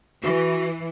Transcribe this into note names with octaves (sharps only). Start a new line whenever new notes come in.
E3 F#4